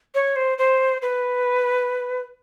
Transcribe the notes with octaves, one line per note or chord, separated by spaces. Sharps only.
C#5
C5
C5
B4